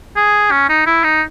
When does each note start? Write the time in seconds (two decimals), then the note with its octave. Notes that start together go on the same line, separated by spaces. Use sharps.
0.16 G#4
0.51 C#4
0.69 D#4
0.86 E4
1.04 D#4